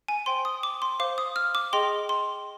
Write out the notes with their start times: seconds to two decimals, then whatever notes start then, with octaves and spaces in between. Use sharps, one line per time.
0.08 G#5
0.26 C5 G5 C6
0.45 D#6
0.63 D6
0.82 C6
1.00 C5 F5 D6
1.18 D#6
1.36 F6
1.55 D6
1.73 G#4 D#5 G5 C6
2.09 C6